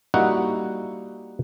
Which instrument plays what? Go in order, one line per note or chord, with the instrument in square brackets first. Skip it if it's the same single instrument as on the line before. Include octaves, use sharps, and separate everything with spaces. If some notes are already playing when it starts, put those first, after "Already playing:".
[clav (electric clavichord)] G3 A#3 D#4 E4 F#4 F#5